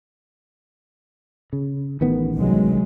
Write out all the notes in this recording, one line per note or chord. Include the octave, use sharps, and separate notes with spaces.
C#3
A1 D#3 B3
C2 F#3 G#3